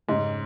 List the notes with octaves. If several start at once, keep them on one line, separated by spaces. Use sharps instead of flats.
F2 G#2 C#3 G#3 C#4